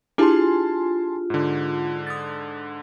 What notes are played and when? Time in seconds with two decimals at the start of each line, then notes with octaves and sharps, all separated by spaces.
0.18 D4 E4 F4 G4 G#4 G#5 A5 C6
1.30 G#2 D3
2.07 D#6 A6